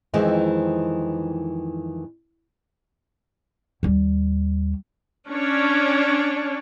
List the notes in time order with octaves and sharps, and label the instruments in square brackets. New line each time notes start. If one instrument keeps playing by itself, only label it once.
[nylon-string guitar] F2 D#3 E3 G#3 C4
[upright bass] D#2 G3
[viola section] C#4 D4 C#5